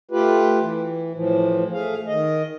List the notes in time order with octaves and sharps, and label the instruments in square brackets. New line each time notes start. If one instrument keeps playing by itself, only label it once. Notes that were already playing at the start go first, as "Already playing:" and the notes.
[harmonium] A3 F4 G4 B4
E3
A2 E3 F3
A3 G#4 F5
D#3 D#5